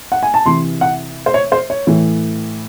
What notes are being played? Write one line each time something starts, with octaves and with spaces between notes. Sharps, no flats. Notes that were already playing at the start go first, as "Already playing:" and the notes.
F#5
G#5
A5
C3 E3 C6
F#5
C5
C#5
C5
C#5
A2 E3